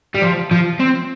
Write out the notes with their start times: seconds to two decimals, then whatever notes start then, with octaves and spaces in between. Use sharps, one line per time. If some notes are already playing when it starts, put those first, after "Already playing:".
0.14 G3
0.22 F3
0.51 F3
0.79 C4